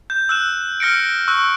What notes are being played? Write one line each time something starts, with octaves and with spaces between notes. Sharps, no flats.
G6
E6 F#6 E7
F6 A#6 C#7 D7
C#6 E6 F#6